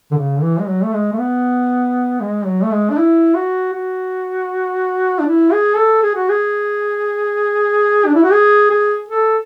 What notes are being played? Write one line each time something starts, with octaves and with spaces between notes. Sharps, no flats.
D3
C#3
D3
E3
G#3
F#3
A3
G#3
A3
B3
G#3
F#3
A3
G#3
D4
E4
F#4
F#4
D4
E4
G#4
A4
G#4
F#4
G#4
D4
E4
F#4
G#4
G#4
A4